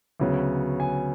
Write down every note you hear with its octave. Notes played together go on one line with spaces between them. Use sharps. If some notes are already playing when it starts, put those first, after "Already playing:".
D2 C#3 F#3 B3
G#5